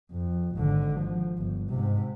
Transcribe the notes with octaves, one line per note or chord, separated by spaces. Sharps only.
F2
G#1 D3
F3
G1
G#2 C3